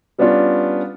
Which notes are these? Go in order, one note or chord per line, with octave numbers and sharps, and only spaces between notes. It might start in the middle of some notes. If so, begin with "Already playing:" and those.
G3 B3 C#4 D4 F4